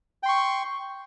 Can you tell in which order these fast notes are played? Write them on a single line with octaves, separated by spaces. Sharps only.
G5 C6 C#6